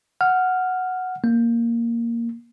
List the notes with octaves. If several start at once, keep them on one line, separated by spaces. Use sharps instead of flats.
F#5 F6
A#3